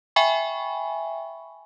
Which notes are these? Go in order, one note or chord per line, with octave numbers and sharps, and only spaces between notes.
E5 G5 G#5 B5 C#6